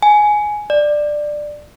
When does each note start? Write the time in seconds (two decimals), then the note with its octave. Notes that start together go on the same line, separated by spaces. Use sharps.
0.03 G#5
0.70 D5